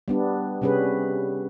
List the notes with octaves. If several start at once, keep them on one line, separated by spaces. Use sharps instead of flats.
G3 B3 D4
C3 G3 C#4 G#4 B4